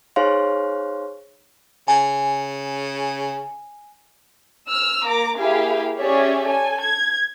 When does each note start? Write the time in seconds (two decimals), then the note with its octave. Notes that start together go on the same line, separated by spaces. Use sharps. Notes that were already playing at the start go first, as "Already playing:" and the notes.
0.16 D#4 G#4 C5 C#5 F5 C6
1.88 C#3 G#5
4.68 E6 F6
5.05 A#3 A#5 D6
5.37 A#3 E4 G4 G#4 F5
5.98 C#4 G4 G#4 C#5 D5 E5
6.44 A4 G#5
6.81 G#6